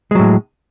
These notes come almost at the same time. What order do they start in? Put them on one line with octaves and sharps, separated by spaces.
G#3 F#3 A2